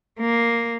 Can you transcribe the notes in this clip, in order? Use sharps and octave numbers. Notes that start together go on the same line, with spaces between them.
A#3